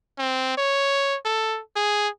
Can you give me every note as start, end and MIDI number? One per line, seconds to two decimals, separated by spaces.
0.18 0.56 60
0.57 1.17 73
1.25 1.60 69
1.76 2.09 68